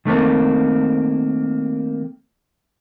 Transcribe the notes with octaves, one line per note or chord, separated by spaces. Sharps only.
D#3 A3 A#3 C4